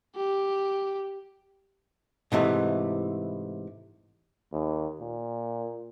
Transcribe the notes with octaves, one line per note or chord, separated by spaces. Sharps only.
G4
G#2 C3 E3 A3
D#2
A#2